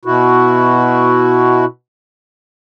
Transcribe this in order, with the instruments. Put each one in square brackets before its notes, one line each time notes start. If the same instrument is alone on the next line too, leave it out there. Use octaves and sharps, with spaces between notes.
[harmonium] B2 E4 F#4